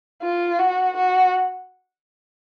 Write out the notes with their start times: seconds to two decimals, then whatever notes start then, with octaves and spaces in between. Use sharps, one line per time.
0.22 F4
0.59 F#4
0.96 F#4